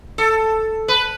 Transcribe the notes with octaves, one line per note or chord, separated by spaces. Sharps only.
A4
B4